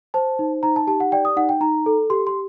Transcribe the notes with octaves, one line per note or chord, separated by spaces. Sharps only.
C5 A5
D#4
D#4 A#5
A5
G4 A5
F#5
D5 G5
D#6
D#4 F#5
G5
D#4 A#5
A4
G4 C6
C6